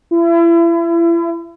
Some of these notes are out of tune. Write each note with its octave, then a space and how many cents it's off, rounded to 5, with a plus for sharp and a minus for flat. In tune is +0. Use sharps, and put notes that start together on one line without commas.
E4 +35